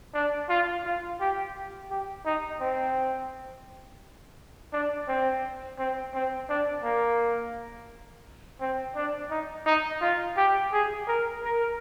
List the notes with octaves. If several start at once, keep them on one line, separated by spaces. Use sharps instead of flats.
D4
F4
F4
G4
G4
D#4
C4
D4
C4
C4
C4
D4
A#3
C4
D4
D#4
D#4
F4
G4
G#4
A#4
A#4